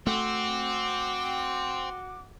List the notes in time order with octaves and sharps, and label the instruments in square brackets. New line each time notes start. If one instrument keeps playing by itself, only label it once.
[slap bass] A3 [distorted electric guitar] C4 [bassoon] F#4 [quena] D6